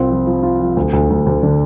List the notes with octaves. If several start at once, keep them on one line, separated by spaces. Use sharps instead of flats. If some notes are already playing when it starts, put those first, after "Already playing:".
Already playing: C2 C4 F4
F3
F3
F4
F3
D2
D2
D2
D2
D3